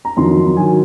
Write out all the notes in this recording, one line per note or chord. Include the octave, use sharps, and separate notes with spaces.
A#5
F2 D#3 F#3 C6
D#3 F#3 G#5